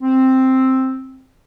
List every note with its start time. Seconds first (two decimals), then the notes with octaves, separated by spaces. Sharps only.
0.01 C4